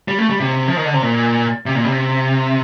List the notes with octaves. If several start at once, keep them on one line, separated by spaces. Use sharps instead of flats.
G3
A3
G3
C3
F3
D#3
D3
C3
A#2
C3
A#2
C3